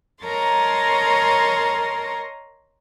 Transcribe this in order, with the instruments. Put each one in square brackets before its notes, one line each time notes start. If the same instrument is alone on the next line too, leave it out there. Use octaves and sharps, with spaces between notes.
[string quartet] A#4 C#5 D#5 A5 A#5 C6